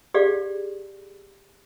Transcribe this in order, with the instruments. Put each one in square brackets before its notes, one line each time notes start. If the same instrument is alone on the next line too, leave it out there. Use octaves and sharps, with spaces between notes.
[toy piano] G4 G#4 D5 F5